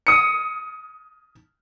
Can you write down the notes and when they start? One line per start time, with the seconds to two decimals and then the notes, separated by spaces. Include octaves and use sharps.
0.07 D#6 C#7